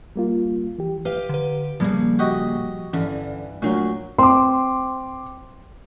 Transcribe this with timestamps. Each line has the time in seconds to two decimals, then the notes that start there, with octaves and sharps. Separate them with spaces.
0.16 G3 A#3 F4
0.79 E3 G4
1.05 G4 B4 F5
1.29 D3 B4
1.80 A#2 C#3 F3 G3 A#3
2.19 F#4 G4 D#5
2.93 G2 D3 E3 C#4
3.62 A#2 F#3 A3 D4
4.18 C4 C6 D6